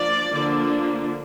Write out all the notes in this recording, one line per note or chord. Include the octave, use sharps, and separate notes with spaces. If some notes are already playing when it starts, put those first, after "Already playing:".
Already playing: F3 A#3 D4 D5
D3 F3 A#3 D4